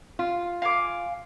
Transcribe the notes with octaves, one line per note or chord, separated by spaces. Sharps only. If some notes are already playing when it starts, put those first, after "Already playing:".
F4
F5 G#5 D6